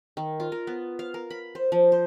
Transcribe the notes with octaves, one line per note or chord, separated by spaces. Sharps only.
D#3
F4
A#4
B3
F5
A#4
B5
C5
F3
C5